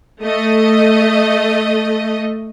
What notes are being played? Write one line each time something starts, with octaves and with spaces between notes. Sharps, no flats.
A3 D#5